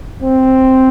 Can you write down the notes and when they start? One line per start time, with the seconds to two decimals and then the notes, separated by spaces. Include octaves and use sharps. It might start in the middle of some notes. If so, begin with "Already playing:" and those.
0.23 C4